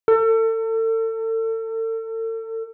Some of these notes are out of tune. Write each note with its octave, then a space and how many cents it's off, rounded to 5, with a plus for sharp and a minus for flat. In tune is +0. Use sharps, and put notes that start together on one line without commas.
A4 +35